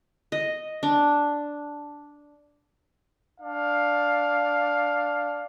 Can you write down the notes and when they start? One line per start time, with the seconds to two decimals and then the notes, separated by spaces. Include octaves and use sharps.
0.32 D#5
0.83 D4
3.39 D4 F5